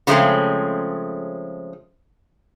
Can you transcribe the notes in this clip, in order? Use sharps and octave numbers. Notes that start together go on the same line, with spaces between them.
C#3 F3 G#3 A3 C4 C#4